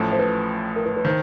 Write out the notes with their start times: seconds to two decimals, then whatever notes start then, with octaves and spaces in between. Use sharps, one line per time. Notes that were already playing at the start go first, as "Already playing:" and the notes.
Already playing: A1 A2 F3
0.12 C5
0.19 B4
0.76 A#4
0.85 B4
0.96 B4
1.05 D#3 C5